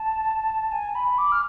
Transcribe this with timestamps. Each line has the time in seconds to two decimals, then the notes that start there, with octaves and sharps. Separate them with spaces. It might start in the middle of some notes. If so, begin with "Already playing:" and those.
Already playing: A5
0.72 G#5
0.95 B5
1.18 D6
1.32 F6